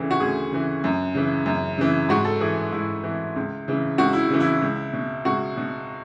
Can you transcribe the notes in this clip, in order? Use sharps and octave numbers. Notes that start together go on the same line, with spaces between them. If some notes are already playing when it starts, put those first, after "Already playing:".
Already playing: D2 C#3 E3
F#4
D2 G#4
C#3 E3
F#2
C#3 E3
F#2
C#3 E3
G#2 F#4
A4
E3 G#4
G#2 E4
E3
C#2
C#3 E3
C#2 F#4
E4
C#3 E3
E4
C#2
B2
C#2 F#4
B2